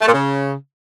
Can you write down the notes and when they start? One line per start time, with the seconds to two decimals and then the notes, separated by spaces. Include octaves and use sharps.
0.01 A3
0.07 A#2
0.13 C#3